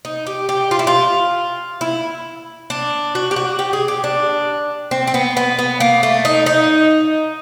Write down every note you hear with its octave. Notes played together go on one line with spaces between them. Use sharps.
D#4
G4
G4
F4
E4
F4
E4
D4
F#4
G4
F#4
G4
G#4
G4
D4
C4
C4
B3
B3
B3
A#3
A3
D#4
D#4